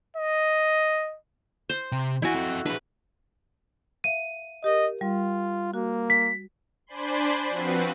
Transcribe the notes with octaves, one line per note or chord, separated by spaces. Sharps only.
D#5
C5
C3
E2 E4 F#4 G#5
C4 A4
D4 G#4 B4
E5 F5 D#7
G4 A#4 D#5
G3 F4
A#3 F#4
B6
D4 C5 D5 G#5 B5 C6
F3 C4 F#4 B4